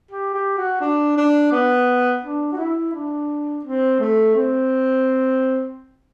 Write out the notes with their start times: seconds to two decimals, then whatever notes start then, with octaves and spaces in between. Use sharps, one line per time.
0.11 G4
0.34 G4
0.58 F#4
0.81 D4
1.17 D4
1.52 B3
2.23 D4
2.52 F#4
2.57 E4
2.93 D4
3.64 C4
4.00 A3
4.35 C4